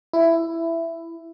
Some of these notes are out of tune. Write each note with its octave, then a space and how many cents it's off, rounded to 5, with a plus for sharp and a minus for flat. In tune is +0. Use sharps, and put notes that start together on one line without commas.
E4 +10